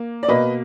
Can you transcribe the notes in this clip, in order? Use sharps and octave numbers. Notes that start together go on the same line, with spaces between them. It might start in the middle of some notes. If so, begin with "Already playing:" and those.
Already playing: A#3
D5
B2 A#3 B4 D#5